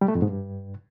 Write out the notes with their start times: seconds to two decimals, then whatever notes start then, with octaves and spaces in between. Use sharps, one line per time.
0.01 G3
0.08 A3
0.15 F2
0.22 G#2
0.29 G2